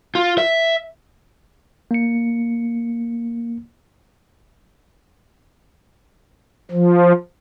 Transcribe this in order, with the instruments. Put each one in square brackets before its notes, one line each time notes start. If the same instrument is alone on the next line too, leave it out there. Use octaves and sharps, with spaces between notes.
[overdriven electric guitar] F4
E5
[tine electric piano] A#3 C#7
[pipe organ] F3